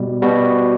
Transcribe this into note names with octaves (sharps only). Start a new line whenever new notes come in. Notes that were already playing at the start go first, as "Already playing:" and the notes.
Already playing: B2 G3
B2 G3 F#4